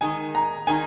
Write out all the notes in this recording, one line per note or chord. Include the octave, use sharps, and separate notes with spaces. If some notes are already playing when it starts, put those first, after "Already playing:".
D#3 G#3 D#4 G#5
A#5
D#3 G#3 D#4 G#5